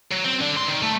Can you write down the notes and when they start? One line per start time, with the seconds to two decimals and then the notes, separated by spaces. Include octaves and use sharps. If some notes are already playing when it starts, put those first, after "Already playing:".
0.12 F#3
0.25 C4
0.42 D3
0.56 G#2 C6
0.68 D#3
0.82 A3